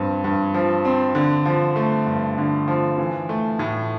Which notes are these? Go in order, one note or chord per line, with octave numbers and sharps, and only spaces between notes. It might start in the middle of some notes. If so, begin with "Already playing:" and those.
Already playing: G2 F3 C4
G2
F3
C4
D3
F3
A3
G2
D3
F3
E3
A3
A2